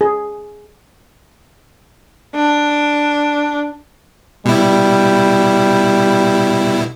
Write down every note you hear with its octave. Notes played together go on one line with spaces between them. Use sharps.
G#4
D4
B2 G3 E4